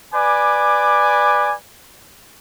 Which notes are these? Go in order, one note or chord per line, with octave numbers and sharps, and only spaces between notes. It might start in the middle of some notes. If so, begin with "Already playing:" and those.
B4 D5 G#5 D6